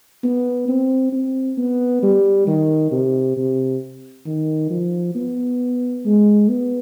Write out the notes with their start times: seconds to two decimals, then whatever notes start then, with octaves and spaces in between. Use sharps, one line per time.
0.24 B3
0.68 C4
1.12 C4
1.57 B3
2.02 G3
2.47 D#3
2.91 C3
3.36 C3
4.26 D#3
4.70 F3
5.15 B3
6.05 G#3
6.49 B3